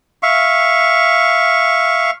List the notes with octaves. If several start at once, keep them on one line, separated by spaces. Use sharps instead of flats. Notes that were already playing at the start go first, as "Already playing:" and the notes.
E5 F5 C#6